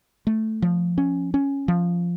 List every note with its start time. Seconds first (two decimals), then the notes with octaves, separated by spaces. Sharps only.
0.27 A3
0.62 F3
0.98 C#4
1.34 C#4
1.68 F3